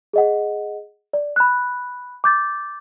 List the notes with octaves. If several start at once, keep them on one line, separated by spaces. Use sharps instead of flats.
G#4 D#5 F#5
D5
B5 F#6
D6 G6 A6